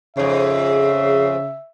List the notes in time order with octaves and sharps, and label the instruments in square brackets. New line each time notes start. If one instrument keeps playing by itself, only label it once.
[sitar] F2 G#2 [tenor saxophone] C#3 [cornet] E5